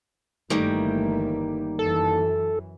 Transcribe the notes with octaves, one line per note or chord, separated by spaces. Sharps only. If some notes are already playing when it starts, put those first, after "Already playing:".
G1 D#3 E3 G3 A3 A#3
F#2 E3 A4